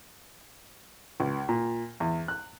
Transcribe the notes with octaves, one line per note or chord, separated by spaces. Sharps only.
C#2
A#2
E2
F#6